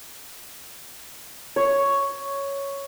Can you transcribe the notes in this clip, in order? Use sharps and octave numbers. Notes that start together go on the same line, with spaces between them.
C#5